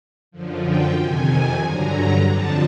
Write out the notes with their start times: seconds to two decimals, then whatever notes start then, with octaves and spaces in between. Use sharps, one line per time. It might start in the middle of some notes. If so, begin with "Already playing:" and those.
0.31 F#2 D3 F3
0.63 G5
0.95 F2 C3 D#3 G#5
1.62 G2 D3 F#3 A#5
2.26 F2 D3 F3 A5